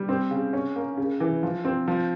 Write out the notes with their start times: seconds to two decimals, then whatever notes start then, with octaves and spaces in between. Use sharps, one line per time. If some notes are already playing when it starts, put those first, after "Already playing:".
Already playing: G3
0.09 C4
0.31 C#3
0.53 C#4
0.76 A#3
0.97 C#3
1.20 E3
1.43 F3
1.65 C4
1.88 F3